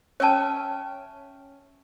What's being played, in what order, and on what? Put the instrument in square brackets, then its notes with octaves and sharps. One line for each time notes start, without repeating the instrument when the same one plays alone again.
[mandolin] C#4 E5 G5 [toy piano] C#5 A5